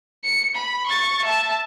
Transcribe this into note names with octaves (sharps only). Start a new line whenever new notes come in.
C#7
B5
C#6 A6
E5 A5